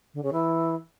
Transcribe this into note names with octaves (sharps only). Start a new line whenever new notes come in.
D3
C#3
E3